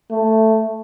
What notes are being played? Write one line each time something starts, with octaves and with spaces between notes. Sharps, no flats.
A3